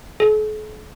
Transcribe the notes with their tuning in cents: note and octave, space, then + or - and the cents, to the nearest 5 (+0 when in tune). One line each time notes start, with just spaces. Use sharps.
A4 -45